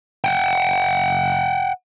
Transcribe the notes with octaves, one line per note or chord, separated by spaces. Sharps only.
F#5 G5